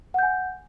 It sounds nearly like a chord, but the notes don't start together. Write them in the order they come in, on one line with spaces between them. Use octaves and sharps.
F#5 G6 G#5